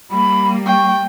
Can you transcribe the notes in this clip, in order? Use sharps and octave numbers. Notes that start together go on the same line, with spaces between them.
G3 A#3 B5
G5 C#6